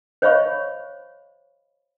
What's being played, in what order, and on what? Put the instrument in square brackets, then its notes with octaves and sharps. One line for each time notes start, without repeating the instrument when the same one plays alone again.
[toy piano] C5 C#5 D#5 F5 B5 C#6